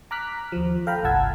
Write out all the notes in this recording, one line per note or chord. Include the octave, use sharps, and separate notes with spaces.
A#5 D6 F6 F#6 B6
D#2 F3
A4 F5 G5 A#5 B5
G1 C2 F#5 A5 E6 G#6